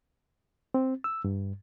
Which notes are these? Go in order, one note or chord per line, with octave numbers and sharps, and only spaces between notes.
C4
E6
G2